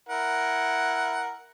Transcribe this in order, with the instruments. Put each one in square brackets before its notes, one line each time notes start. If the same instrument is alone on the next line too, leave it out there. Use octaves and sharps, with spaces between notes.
[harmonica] E4 A#4 F#5